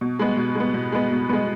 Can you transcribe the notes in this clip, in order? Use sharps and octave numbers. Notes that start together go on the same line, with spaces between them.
B2
G#3 B3
B2
G#3 B3
B2
G#3 B3
B2
G#3 B3